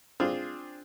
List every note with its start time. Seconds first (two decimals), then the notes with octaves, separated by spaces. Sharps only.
0.20 C4 D4 F4 G#4